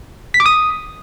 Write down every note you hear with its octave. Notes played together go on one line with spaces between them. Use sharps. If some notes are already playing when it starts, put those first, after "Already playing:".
B6
D6
D#6